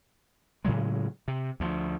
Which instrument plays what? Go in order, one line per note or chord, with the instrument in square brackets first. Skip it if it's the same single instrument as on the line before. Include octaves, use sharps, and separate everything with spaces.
[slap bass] A2 C#3 F#3 G#3
C3
D2 F3